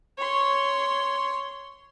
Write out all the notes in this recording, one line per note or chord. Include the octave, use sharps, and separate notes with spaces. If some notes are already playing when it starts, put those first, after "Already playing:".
C#5 C6